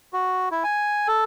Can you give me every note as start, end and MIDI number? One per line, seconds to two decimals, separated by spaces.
0.13 0.49 66
0.51 0.64 64
0.64 1.08 80
1.08 1.24 69